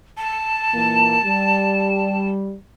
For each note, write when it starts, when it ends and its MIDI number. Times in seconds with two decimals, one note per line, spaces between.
0.17 2.26 81
0.73 1.18 46
0.73 1.18 52
0.73 1.18 58
1.24 2.54 55